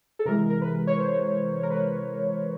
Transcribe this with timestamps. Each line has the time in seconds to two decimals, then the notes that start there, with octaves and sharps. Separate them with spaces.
0.19 A4
0.25 C3 E3 G#3 A#4
0.50 A#4
0.62 B4
0.87 C#5
0.99 C5
1.63 A#4
1.70 B4